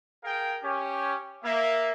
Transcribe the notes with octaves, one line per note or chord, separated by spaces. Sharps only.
G#4 A#4 F5 G5
C#4 G4
A#3 E5